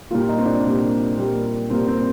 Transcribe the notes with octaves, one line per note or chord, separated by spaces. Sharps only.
A#2 G3 A#3 F4
D#4
C4
D4
A#2 G3 A#3
A#2 G3 A#3
A#2 G3 A#3 C4
C4